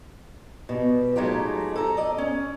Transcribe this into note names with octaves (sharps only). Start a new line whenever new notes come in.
B2 G3
F#3 G#3 A3 D#4 F4 G4
A4 A#5
D5 D#5
C#4